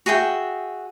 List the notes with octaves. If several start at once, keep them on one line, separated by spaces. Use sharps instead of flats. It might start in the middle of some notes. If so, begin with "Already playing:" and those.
F#4 G#4 E5 G5